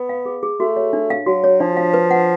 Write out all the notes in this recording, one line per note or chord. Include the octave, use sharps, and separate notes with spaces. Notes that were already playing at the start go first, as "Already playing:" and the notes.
Already playing: B3
F5
G#4
G#4
A3 F#4
C#5
D4
F5
F#3 F#4
C#5
F3 D4
F5
B4
F#5